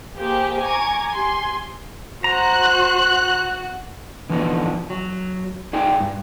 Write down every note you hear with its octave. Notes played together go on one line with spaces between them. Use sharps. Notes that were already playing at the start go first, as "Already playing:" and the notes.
A#3 G4 G#4 C5
G#5 A#5 C#6 D6 G#6
G4 G#5 C6
F#4 C5 A#5 F#6
D3 E3 F3 B3 D4 D#4
F#3
D#4 G#4 D5 G5
G2